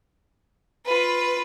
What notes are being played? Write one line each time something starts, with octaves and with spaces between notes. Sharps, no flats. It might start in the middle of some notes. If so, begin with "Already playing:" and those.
F4 B4